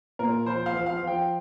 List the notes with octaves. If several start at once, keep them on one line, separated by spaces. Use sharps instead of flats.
A#2 A#4
F3 C5
F5
F3
F5
F3
G5